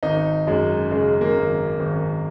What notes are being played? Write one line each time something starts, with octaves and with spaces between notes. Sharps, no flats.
G#1 D#4
F#2 G#3
C#3 G#3
A#3
G#1
G#1